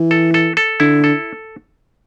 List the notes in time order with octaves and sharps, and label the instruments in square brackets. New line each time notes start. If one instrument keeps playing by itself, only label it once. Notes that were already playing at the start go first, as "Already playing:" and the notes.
Already playing: [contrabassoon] E3
[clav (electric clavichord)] A4
A4
A4
[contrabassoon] D3 [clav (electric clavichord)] E4
[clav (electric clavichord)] A4